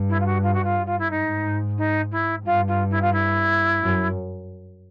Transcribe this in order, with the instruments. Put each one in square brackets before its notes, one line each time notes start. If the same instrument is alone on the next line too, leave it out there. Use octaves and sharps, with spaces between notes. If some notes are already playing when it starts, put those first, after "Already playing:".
Already playing: [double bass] G2
[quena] E4
F4
F#4
F4
F#4
F4
F4
E4
[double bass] G#2 [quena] D#4
[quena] D#4
E4
[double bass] G2 [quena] F4
[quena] F4
E4
F4
E4
[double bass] F#2